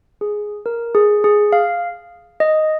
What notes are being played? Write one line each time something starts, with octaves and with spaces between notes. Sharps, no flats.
G#4
A#4
G#4
G#4
F5
D#5